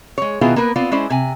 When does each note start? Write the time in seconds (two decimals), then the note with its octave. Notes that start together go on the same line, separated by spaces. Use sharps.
0.18 G#3 C#5
0.41 B2 D#3 B3 E4 F4 G#4
0.56 A#3 B3 A#4 B4
0.76 B3 C4 F4 D5
0.92 G#3 C#4 E4 C5 D5
1.10 C3 G#5